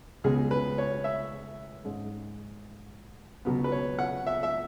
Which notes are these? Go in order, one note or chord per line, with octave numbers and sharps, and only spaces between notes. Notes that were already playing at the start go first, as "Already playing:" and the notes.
C#2 B2 G#3 B3 G#4
B4
C#5
E5
G#2 G#3 C#4
C#2 B2 F#3 B3
B4
C#5
F#5
E5
E5